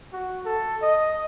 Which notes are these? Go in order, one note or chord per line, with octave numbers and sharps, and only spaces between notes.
F#4
A4
D#5